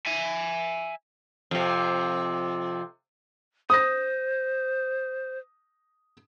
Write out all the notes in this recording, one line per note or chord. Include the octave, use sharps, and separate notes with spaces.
E5 G#5
F2 C3
C5 D#6 A#6